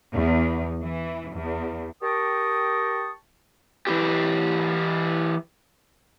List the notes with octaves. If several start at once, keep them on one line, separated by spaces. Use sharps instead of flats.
E2
E3
E2
G4 A#4 G5 A5 C#6 D#6
E3 E4 G4